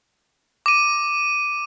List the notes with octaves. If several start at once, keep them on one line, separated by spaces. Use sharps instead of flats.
D6 D#7